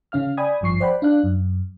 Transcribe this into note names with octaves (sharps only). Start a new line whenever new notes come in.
C#3 C#4 F5 F6
D5 G5 G#5 B5 D#6 G#6
G#1 G2 F3 C#6 C7
C5 D5 F#5 G5 B5
D4 F5 F#6
F#2